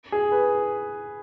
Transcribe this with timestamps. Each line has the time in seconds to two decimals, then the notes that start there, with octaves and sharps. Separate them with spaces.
0.12 G#4
0.32 B4